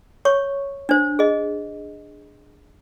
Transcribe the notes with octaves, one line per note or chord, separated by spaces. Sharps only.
C#5 C#6
D4 C5
G#4 D#5